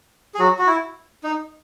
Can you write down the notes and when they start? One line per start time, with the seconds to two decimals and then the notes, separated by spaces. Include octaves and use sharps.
0.34 G#4
0.39 F#3 F#4
0.59 F#4
0.67 E4
1.24 D#4